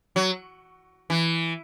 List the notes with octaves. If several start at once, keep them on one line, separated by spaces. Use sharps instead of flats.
F#3
E3